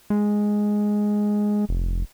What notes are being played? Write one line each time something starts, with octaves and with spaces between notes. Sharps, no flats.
G#3
F1